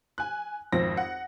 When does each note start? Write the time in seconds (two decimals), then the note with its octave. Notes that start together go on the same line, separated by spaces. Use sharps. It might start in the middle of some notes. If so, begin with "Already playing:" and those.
0.18 G#5 F#6
0.72 G#1 F2 C4 A#6
0.97 F#5